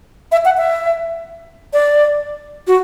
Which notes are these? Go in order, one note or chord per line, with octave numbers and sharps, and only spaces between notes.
E5
F#5
E5
D5
F#4